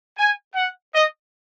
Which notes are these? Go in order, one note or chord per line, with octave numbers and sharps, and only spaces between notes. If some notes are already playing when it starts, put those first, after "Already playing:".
G#5
F#5
D#5